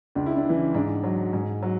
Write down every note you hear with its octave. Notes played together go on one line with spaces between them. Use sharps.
C#2 D4
E4
D4
C#3 E3
G#2 D4
F#3
G#2
F#3